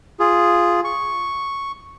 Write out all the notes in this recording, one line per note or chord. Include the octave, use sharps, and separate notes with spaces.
F4 G#4
C#6